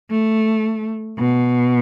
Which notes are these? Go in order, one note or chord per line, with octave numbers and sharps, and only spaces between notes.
A3
B2